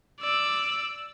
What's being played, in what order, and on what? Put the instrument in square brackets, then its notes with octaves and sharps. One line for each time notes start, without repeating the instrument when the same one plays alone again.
[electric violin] D5 E6